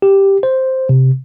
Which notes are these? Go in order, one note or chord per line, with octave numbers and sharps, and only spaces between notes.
G4
C5
C3